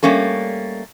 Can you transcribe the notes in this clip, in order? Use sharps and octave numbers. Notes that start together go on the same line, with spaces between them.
G3 A3 A#3 C#4 A4